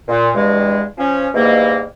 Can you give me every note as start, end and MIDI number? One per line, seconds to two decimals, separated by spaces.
0.08 0.29 46
0.35 0.82 40
0.35 0.82 43
0.35 0.82 56
0.98 1.27 53
0.98 1.27 61
1.34 1.83 44
1.34 1.83 47
1.34 1.83 52
1.34 1.83 55
1.34 1.83 58